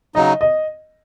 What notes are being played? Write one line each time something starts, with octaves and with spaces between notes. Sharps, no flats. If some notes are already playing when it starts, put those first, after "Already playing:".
C#3 F#3 D#4 D#5
D#5